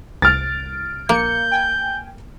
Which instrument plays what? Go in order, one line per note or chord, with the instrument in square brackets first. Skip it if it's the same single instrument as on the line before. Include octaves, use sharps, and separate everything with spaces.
[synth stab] C2 D7 [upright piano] F6 A6
[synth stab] A#1 C#7 [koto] A#3 [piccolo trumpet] G6
[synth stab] G5 G#5